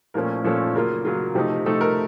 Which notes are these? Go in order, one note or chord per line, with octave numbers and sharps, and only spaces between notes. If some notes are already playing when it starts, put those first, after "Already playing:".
A#2 F3 A3 C#4 A#4
A#2 F3 A3 C#4 A4
C#3 F#3 A#3 F4 A#4
C#3 F#3 A#3 F4
C3 F3 A3 D#4
C3 F3 A3 D#4 A4
A#4